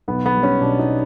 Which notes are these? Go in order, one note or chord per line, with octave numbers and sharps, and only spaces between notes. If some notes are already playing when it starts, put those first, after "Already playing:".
B1 B3
B3
G3
C#4
B2 D4
D#4